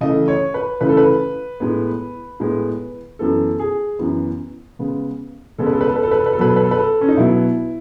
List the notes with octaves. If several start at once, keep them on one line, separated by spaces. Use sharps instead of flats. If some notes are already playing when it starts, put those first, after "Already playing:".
C#3 E3 A3 D#5
C#5
B4
C#3 E3 A3 B4
A4
B4
A2 G#3 B3
A2 G#3 B3
F#2 E3 B3 A4
G#4
F#2 E3 B3
C#3 G#3 B3
C#3 G#3 B3 A4
B4
A4
B4
A4
B4
A4
B4
A4
B4
A4
B2 F#3 B3 B4
A4
B4
A4
B4
A4
C#4
D#4
B2 F#3 B3 E4